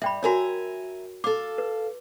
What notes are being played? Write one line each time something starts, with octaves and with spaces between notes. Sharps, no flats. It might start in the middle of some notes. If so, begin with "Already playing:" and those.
G2 E5 G5 B5
F#4 A#4 C#5 E5 G#5 A#5
A4 F5 D6
B4